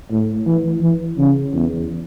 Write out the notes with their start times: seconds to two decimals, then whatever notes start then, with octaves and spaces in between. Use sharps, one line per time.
0.11 A2
0.46 E3
0.82 E3
1.18 C#3
1.54 E2